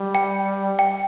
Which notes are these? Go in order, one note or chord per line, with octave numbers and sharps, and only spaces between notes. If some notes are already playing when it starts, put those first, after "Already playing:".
Already playing: G3
G5
G5